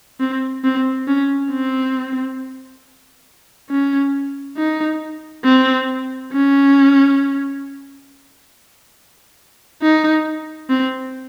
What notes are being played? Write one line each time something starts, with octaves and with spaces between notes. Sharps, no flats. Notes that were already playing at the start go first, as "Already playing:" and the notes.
C4
C4
C#4
C4
C#4
D#4
C4
C#4
D#4
C4